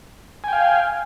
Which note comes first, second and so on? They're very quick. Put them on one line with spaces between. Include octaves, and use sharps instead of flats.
G#5 G5 F5